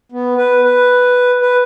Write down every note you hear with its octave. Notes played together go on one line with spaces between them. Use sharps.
B3
B4
B4
B4